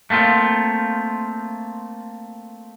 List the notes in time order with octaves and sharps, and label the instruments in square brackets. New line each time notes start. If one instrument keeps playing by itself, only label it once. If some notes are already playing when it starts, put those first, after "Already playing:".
[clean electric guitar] A3 A#3 C4 F4